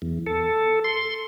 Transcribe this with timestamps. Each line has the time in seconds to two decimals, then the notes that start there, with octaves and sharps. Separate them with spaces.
0.02 E2
0.26 A4
0.84 C6